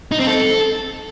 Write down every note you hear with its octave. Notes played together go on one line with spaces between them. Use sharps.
D#4
C4
A4